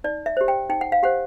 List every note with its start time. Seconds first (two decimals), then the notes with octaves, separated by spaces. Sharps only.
0.04 D#4 D5
0.26 E5
0.37 G4 C5
0.48 G5
0.70 D#4 G5
0.81 F#5
0.92 F5
1.03 G4 C5 F#5